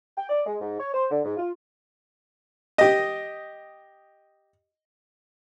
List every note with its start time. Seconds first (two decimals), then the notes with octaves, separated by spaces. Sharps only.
0.18 G5
0.30 D5
0.46 G#3
0.61 G#2
0.80 C#5
0.94 C5
1.11 D3
1.25 G#2
1.38 F4
2.78 G4 D#5